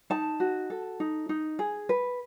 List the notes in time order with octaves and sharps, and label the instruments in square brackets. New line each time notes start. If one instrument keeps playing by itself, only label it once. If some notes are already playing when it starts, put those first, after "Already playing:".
[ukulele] D#4 A5
F#4
A4
D#4
D#4
G#4
B4